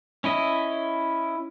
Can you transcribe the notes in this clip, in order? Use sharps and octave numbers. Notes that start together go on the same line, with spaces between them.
C#4 E4 D#5